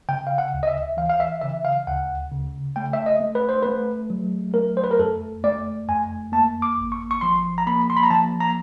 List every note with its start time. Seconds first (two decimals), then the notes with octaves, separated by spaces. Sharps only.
0.09 C#3 G5
0.27 F5
0.38 F#5
0.53 D2
0.63 D#5
0.67 E5
0.97 E3 F5
1.10 F5
1.20 E5
1.42 C#3 E5
1.65 F5
1.87 D2 F#5
2.32 C#3
2.76 A3 G5
2.93 E5
3.06 D#5
3.20 A3
3.35 B4
3.49 C5
3.63 A3 B4
4.10 F#3
4.54 A3 A#4
4.77 C5
4.84 B4
4.91 A#4
4.99 F2 A4
5.44 A3 D5
5.88 F2 G#5
6.32 A#3 A5
6.62 D6
6.78 G#1
6.92 C#6
7.11 C#6
7.21 F3 C6
7.58 A#5
7.67 A#3 B5
7.90 C6
7.97 B5
8.03 A#5
8.10 F3 A5
8.40 A#5